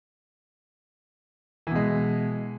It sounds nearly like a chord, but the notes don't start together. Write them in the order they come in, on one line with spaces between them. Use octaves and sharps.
E3 B2 G#3